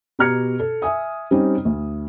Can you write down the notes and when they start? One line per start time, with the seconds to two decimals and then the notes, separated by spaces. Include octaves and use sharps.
0.19 B2 G4 A#5 F6 G#6 C#7
0.60 A4
0.82 E5 G#5 D#6
1.31 G3 C4 C#4 D#4 G4
1.65 D2